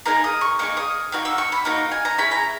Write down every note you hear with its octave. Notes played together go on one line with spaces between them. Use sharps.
A#3 D#4 G#4 A#5
D#6
C#6
A#3 D#4 G#4 C#6
D#6
A#3 D#4 F#4
E6
C#6
B5
A#3 D#4 F#4 A#5
G#5
A#5
C#4 E4 G#4 B5
A#5